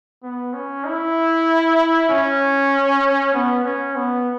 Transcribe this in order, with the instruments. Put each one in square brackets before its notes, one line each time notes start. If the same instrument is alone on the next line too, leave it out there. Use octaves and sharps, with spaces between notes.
[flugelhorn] B3
C#4
E4
C#4
B3
C#4
B3